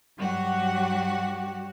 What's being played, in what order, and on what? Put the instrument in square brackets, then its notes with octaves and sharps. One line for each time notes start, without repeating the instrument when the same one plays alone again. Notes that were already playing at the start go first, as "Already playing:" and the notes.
[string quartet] G2 F#3 F#4 G4 F#5